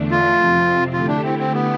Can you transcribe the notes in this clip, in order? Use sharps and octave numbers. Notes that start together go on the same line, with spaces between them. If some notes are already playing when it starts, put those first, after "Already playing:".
Already playing: E2 D3 A3 D4
F4
F2 C3 F3 C4
D3 A3 E4 F4 G4
D4
C4
C4
B3